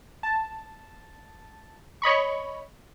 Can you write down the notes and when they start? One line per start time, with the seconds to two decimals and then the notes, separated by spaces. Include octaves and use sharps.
0.23 A5
2.02 C#5 D#5 B5 C#6